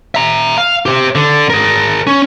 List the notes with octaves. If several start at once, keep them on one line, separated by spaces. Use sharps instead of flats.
E5 A#5
F5
G4 C5
D3
G#4 A#4
C#4